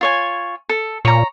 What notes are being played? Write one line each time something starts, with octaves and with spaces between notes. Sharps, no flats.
F4 C#5 G#5
A4
A#2 C#5 A#5